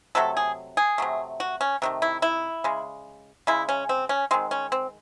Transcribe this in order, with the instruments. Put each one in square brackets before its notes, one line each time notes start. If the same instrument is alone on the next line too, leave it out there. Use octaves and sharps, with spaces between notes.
[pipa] C3 F#3 A3 A4
G#4
G#4
C3 F#3 A3
F#4
C#4
C3 D#3 A3
E4
E4
C#3 G#3
C#3 G#3 E4
C#4
C4
C#4
D#3 G#3 C4
C#4
C4